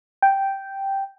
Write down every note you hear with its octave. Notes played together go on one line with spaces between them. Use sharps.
G5